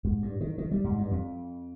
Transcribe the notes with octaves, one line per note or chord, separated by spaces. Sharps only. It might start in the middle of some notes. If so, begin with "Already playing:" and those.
G#2
G2
D#3
D#3
G3
G#2
G2
F2